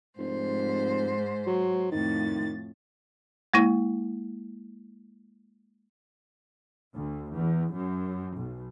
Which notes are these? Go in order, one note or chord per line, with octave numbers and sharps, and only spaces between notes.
F1 G#2 C5
F#3
F2 A2 D#3 A6
G#3 A#3 E4
D2
E2
F#2
B1